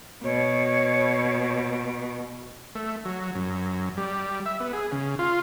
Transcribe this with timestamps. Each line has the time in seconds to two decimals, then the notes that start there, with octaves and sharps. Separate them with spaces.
0.24 B2 C#5
2.75 A3
3.05 F#3
3.35 F#2
3.97 G3
4.46 E5
4.60 B3
4.73 G#4
4.92 C#3
5.19 F4